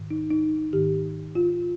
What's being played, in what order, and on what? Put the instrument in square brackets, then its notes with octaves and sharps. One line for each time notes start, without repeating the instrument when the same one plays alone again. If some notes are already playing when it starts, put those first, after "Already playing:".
Already playing: [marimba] G#2 D#3
D#4
D#4
G#2 D#3 G4
F4